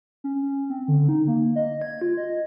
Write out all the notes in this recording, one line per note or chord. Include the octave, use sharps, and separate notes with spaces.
C#4
C4
D3
D#4
A#3
D#5
G#6
F4
D#5